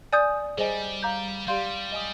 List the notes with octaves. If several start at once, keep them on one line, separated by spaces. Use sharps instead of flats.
D5 G#5 D#6 G6
G3 G#4 C5 D#5 G#5
F5 A#5 D6 G6
G3 G4 D5 F5 C6 G6
D#5 G#5 D#6